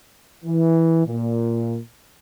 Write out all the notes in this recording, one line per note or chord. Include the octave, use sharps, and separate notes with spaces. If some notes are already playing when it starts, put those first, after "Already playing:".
E3
A#2